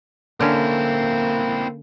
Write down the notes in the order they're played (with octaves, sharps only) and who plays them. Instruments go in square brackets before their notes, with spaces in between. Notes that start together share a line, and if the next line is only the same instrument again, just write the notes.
[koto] D3 C#4 [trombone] A#3 [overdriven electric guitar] C4 E4